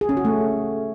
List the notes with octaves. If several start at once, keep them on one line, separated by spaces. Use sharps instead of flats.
G#4
C#4
F#4
A3